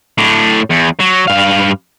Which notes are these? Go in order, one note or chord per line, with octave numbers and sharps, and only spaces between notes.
A2 D4
E2
F#3
G2 F5